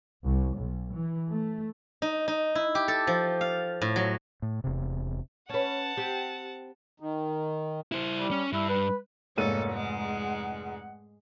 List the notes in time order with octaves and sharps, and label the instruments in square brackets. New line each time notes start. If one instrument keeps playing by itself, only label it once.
[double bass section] C2
B1
E3
A3
[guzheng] D#4
D#4
E4
G4
A4
F3
F5
A2
F#3
[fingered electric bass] A2
E1 C3
[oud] C#4 B4 [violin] F#5 A5
[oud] C4 G4
[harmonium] D#3
[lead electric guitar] E4 C5
[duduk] G3
[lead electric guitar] C#4
[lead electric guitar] G2 [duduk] E4
[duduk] B4
[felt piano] F1 G#2 D#7 [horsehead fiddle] A#3 C#5 [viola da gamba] A4
[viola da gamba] G#3 [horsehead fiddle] F#5